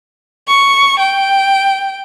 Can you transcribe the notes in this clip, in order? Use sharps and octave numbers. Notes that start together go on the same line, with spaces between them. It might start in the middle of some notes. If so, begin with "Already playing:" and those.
C#6
G5